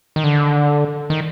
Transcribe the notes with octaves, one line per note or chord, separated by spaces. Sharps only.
D#3
D3
D#3